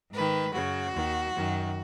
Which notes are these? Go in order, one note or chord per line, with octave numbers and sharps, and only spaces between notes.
G#2 D#3 B4
F#2 C#3 F#4
D#2 D#3
F#2 D#3